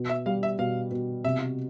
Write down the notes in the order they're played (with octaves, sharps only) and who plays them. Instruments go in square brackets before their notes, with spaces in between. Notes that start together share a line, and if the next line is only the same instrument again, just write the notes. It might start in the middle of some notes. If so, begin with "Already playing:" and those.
Already playing: [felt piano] B2
[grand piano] E5
[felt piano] G3 [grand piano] F5
[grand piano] E5
[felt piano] B2 [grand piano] F5
[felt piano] B2
[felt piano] C3 [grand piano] E5